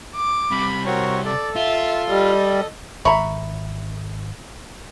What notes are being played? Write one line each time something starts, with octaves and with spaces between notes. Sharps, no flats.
D6
C3 G3 B5
C4 F#4 A#4 C#5
A4 D5
F4 E5
G3 D#5
G#1 E5 A#5 B5 C#6